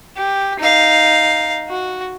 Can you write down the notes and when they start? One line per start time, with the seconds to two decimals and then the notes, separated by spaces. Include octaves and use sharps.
0.16 G4
0.60 D#4 F5
1.69 F#4